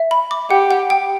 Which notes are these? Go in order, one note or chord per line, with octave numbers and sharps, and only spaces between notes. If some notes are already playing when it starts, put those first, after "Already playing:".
Already playing: E5
B5
D6
G4 F#5
F#5
G5